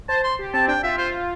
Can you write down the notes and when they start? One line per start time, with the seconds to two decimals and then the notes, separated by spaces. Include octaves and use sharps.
0.09 C5 A5
0.24 C6
0.39 G4
0.54 C4 A5
0.68 D4 G5
0.83 F4 E5
0.98 F4 C5